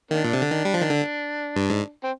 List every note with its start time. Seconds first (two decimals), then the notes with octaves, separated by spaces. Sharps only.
0.11 D#3 A#3 D4
0.24 A#2
0.33 C3
0.42 D3
0.51 D#3
0.65 G3
0.74 F3
0.81 D#3
0.90 D3
1.56 G2
1.70 G#2
2.03 C4